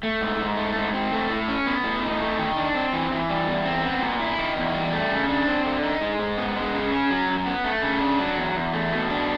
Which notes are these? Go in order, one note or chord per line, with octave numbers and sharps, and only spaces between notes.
A3
G#2
G#2
A3
G#2
C4
A3
A2
C#4
B3
A2
D#4
A3
D#3
D4
C4
E3
E3
G3
E2
C4
B3
A#2
E4
D#3
E2
G3
A3
C#3
D4
C4
D3
D#4
G#3
G#2
B3
G#3
C#3
C#4
F#3
F#2
B3
A3
C#3
D4
F#3
E2
E2
A3
B2
D4